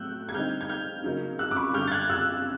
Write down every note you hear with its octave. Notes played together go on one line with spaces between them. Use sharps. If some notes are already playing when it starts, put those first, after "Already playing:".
Already playing: A2 F#3 A3 E6 F#6 G6
G#6
D3 G3 C4 D#4 F6 G6
G#6
F6 G6
C#3 F#3 A#3 D#4
E6 F#6
D6
B5 C#6
F#2 D3 G3 F6 G6
A6
F#6 G#6
E6 F#6